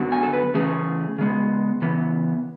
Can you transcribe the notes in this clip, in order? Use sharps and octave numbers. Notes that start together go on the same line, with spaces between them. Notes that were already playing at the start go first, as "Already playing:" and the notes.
Already playing: F#2 D3 F#3 B3
G#5
A4
B4
C#3 E3 A3 C#4 G#4
C#3 G#3 B3
C#3 E3 B3